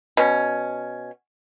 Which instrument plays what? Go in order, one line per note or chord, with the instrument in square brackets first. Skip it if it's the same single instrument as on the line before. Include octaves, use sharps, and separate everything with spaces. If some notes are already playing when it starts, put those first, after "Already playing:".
[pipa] B2 C#4